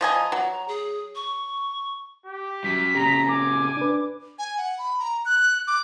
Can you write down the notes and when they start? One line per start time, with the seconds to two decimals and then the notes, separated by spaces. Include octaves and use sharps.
0.01 F3 D#5 G#5 A#5
0.32 F#3
0.68 G#4
1.15 C#6
2.26 G4
2.64 F#2 F#3 B6
2.95 A#2 C#3 G4 A#5
3.29 G#5 D6
3.77 D4 B4
4.39 G#5
4.58 F#5
4.78 B5
4.99 A#5
5.25 F#6
5.67 D6